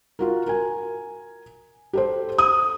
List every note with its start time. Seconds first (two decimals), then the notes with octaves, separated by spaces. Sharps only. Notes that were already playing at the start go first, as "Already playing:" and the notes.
0.19 F4 F#4 A#4
0.47 A#4 G#5
1.93 G4 A4 C5
2.38 D#6